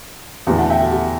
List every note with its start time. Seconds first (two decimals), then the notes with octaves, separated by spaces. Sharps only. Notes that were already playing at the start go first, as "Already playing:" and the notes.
0.47 E2 D3 A3 E4 G4 B4
0.59 F#5 A5
0.70 E5 G5
0.81 F#4 A4
0.92 G4